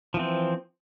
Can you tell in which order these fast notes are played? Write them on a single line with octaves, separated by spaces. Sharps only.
F3 E3 C4